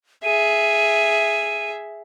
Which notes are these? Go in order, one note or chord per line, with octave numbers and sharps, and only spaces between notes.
G#4 E5 D#7